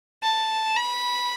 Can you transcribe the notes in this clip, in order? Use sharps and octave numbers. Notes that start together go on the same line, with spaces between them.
A5
B5